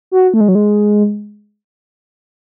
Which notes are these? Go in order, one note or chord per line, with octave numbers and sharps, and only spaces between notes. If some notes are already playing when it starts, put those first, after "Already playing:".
F#4
A3
G#3
F#3
G#3